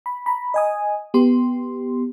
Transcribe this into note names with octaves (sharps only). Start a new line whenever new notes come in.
B5
A#5 B5
D#5 G#5 D#6
B3 G4 C6